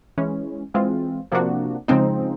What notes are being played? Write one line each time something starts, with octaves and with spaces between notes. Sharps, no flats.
E3 G#3 C#4
E3 G#3 C4 F4
C3 F3 A#3 D4 F#4
C#3 F3 G#3 C4 D#4